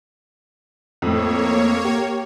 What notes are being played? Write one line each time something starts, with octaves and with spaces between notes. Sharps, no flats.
F2 A2 A#3 C#5
G4